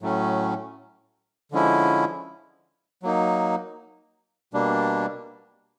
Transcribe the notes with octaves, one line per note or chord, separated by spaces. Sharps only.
A2 F#3 A3 C#4
D3 F3 G#3 C#4 E4
F#3 A#3 D#4
B2 G3 A#3 D4